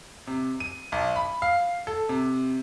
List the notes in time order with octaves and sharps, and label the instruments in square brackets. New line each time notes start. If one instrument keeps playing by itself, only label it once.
[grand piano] C3
D#7
B1
B5
F5
A4
C3